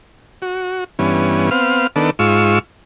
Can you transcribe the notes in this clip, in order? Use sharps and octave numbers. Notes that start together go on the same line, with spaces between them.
F#4
G2 E3 B3 C#4
B3 C4 F5 F6
D#3 B3 D4 A4
G#2 F4 C#6 E6